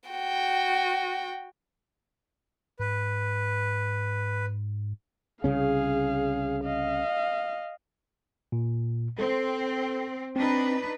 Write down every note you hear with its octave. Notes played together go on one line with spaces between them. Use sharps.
F#4 G5
G#2 B4
C2 C#3 C#4 G#4 F5
D#5 F5
A#2
C4 A4
C4 D4 D#4 B4